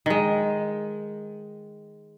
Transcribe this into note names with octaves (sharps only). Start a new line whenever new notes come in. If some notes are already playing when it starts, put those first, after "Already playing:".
D#3 G#3